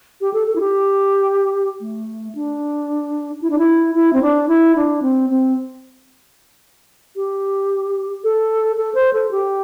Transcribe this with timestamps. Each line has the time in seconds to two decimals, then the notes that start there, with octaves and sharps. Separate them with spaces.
0.21 G4
0.34 A4
0.47 A4
0.56 E4
0.60 G4
1.81 A3
2.35 D4
3.42 E4
3.50 D4
3.58 E4
3.95 E4
4.13 C4
4.22 D4
4.48 E4
4.76 D4
5.02 C4
5.30 C4
7.16 G4
8.24 A4
8.77 A4
8.95 C5
9.13 A4
9.31 G4